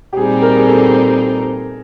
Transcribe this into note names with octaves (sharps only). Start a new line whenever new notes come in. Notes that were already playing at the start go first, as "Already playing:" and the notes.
G4
A#2 G3 C4 D#4 G#4
A#4
G#4
A4